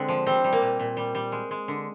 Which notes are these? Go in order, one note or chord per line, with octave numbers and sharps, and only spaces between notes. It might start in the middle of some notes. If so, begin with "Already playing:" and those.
Already playing: D3 G#3 C4
F3
G3 C4
G3
A#3
A#2
A#2
G3
G3
G#3
G#3
D3